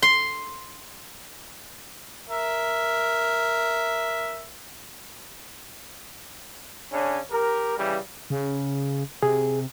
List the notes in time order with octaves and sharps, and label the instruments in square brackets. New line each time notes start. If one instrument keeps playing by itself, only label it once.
[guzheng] C6
[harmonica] A#4 E5
[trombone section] C#3 C#4 D4
G4 A#4
C#3 E3 G3
[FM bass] C#3
[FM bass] C3 [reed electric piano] G#4